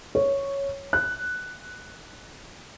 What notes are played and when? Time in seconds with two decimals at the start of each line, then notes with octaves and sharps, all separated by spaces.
0.15 C#5
0.93 F#6